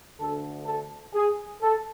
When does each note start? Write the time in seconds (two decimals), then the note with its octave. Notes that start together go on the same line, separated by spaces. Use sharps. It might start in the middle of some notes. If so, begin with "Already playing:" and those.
0.20 D2 D3 A4
0.67 A4
1.14 G#4
1.61 A4